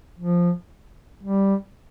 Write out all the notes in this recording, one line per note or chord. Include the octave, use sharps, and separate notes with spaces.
F3
G3